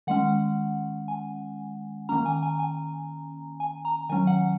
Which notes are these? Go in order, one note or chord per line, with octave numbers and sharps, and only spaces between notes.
D#3 G#3 C#4 F#5
G#5
D#3 A#3 C#4 A#5
G#5
G#5
G#5
G#5
A#5
D#3 F#3 C#4 G#5
F#5